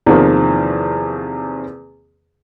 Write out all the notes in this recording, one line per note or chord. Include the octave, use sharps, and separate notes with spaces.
E2 C3 D#3 F3 A#3